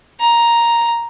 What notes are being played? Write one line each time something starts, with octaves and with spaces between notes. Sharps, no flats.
A#5